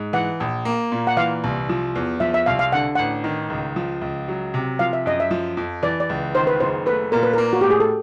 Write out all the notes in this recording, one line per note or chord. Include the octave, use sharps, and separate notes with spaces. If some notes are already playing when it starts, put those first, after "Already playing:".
Already playing: G#2
E3 F#5
A#1
A#3
A#2
F#5
E3 F5
C2
F3
E2
F3 E5
E5
C2 F5
F5
D3 F#5
A1 F#5
D#3
C#2
F3
C#2
F#3
C3
F3 F5
E5
F#2 D#5
E5
F3
F2
E3 D5
D5
C#2
D#3 C5
B4
F#1 C5
A3 B4
A#2 A#4
B4
A#3 A#4
F#4
A2 G4
G#4
A4